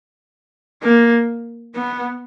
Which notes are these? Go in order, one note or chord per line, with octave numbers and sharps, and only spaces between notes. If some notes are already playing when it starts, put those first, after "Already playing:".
A#3
B3